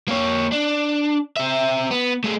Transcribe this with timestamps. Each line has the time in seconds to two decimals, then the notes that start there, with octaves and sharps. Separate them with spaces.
0.08 A#3 C#5
0.52 D4
1.37 C4 E5
1.91 B3
2.24 A3 G#4